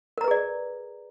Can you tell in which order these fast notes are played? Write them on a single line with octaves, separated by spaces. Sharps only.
A#4 A#5 B4 G#4 D5